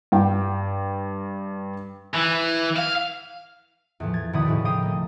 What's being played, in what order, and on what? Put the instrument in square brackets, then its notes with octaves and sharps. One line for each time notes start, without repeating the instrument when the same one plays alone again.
[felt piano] G2 G5
[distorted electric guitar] E3
F5
[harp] E2 A2 F3
G#6 A6
E2 B2 D#3 D5 B5 D#6
D#2 A2 C#3 F3
F5 G5 D#6
A3 A#3